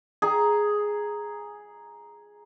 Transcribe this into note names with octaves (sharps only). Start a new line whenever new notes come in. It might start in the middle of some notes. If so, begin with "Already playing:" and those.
G#4 A#5